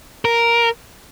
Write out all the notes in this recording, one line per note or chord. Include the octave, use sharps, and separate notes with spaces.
A#4